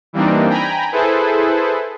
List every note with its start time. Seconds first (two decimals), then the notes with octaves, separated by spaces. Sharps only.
0.13 E3 G3 A#3 C4 D4 D#4
0.49 G5 G#5 A#5 B5
0.92 E4 G#4 A4 B4 C5